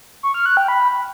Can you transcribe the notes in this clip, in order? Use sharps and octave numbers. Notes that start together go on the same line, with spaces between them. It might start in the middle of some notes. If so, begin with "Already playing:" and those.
C#6
F6
F#6
G5
B5